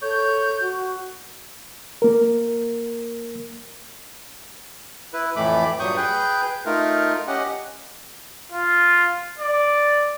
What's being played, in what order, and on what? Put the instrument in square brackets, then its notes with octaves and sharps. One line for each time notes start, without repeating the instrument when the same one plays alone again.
[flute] A4 [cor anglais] C#5 [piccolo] G6
[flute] F#4
[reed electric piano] A#3 A#4
[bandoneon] E4 B4
F2 A2 E3 A3 B5 D6
G2 A#2 F#3 C#6 D#6 G6
G#4 B4 G5 G6
A3 D#4 F4 A#4
C#4 G4 D#5 F#5
[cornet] F4
D5